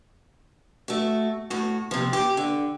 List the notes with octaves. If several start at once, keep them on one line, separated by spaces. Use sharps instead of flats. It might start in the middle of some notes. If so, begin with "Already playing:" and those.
A3 F#4
A2 F#4
C3 F3
G4
D3